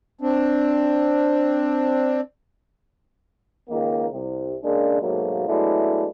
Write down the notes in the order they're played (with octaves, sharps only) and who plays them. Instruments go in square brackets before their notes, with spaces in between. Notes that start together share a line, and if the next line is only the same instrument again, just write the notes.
[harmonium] C4 D4
[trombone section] C#2 D#3 A#3
C2 C3
C#3 G#3 A#3 D4
G#2 B2 F#3 A3 A#3
F#3 G#3 A3 B3 D4 E4